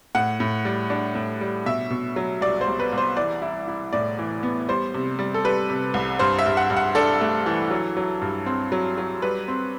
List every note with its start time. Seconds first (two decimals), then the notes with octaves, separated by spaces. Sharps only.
0.15 A2 F#5
0.40 A2
0.65 G3
0.90 D4
1.15 A2
1.41 G3
1.66 B2 E5
1.90 B2
2.16 F#3
2.41 C2 D5
2.61 C5
2.67 C2
2.80 B4
2.92 C2
2.98 C5
3.17 E3 D5
3.42 E4
3.68 E4
3.93 A2 D5
4.19 E3
4.43 B3
4.69 G3 C5
4.94 C3
5.19 G3
5.34 A4
5.45 G3 B4
5.70 C3
5.94 C2
6.19 G2 C5
6.39 E5
6.46 G2
6.57 F#5
6.70 G2
6.77 F#5
6.95 D4 A4
7.21 A3
7.46 E3
7.71 F#3
7.97 F#3
8.22 G2
8.46 C4
8.72 F#3
8.98 F#3
9.22 G3 B4
9.48 C4